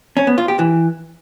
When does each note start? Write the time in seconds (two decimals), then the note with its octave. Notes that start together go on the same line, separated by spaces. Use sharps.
0.17 C#4
0.27 B3
0.38 F4
0.48 G4
0.59 E3